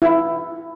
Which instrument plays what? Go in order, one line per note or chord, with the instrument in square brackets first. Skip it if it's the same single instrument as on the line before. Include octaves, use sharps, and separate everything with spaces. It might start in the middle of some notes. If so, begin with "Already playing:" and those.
[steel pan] E4